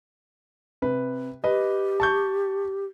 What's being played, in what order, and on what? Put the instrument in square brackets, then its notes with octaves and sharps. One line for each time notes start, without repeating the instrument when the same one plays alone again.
[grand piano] C3 B4
[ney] G4 [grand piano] B4 D#5
[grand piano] A5 C#6 G6